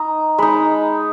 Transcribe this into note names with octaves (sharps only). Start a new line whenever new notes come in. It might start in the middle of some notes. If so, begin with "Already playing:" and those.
Already playing: D#4 D#5 A#5
G#3 D#4 B5